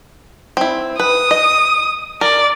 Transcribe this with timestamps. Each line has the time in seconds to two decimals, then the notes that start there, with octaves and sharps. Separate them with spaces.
0.57 C4 E4
1.00 B4 D#6
1.31 D#5
2.21 A#4 D5